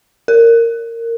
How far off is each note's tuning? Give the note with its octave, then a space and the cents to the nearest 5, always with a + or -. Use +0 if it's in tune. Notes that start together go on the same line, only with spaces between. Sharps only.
A#4 -15